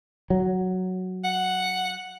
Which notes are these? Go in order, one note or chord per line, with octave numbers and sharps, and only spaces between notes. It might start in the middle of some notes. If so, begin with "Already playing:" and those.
F#3
F#5